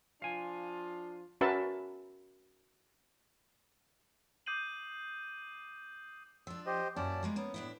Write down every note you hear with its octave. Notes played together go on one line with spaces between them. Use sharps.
F3 D4 F4 F5 G#5
C#4 F#4 A#4 B4 E5 A5
D6 D#6 G6 C7 D#7 F#7
F3 D4 E6
G4 C5 D#5
F#2 A#2 C#4 E4 D5 A5
G3 G#3 A#3
A#3 B3 C#4
A2 D4 E4